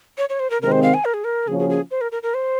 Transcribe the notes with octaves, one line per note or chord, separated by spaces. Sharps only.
C#5
C#5
C5
A#4
C3 D#3 G#3 C4 A#4
C5
F5
G#5
A#4
G#4
A#4
C#3 F3 A#3 C#4 F#4 G#4
G#4
G#4
C5
A#4
A#4
A#4
C5